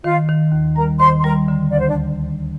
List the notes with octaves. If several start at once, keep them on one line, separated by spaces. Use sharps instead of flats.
D#3 F4 F5
D#3
D#2
G3 A#4 A#5
D#3 C5 C6
C6
G3 A#4 A#5
D3
D2 D5
C5
D4 D5